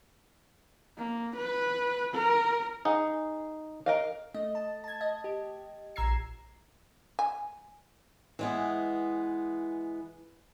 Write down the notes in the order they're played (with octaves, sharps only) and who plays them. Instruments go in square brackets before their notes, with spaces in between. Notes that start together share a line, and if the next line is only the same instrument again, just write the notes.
[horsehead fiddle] A#3
B4
A#4
[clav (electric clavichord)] D#4 [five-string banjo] G#4 F#5
[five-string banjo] A#4 D#5 F5
[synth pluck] A3 D#5
A5
A5 G#6
D#5
G4
A#1 A#5 E6 G#6 C7
[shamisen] G#5
[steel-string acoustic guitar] E3 G#3 B3